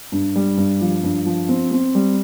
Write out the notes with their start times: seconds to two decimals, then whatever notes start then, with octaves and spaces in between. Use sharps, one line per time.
0.12 G2
0.36 G3
0.57 G2
0.81 F3
1.03 G2
1.26 F3
1.49 C4
1.71 C4
1.95 G3